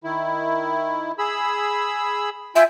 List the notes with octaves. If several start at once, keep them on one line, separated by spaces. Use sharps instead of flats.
D#3 E4
G#4 B5 E6
F4 E5 G5 G#5